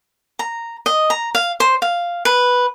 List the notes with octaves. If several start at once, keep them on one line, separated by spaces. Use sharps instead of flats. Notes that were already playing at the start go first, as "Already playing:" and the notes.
A#5
D#5
A#5
F5
C5
F5
B4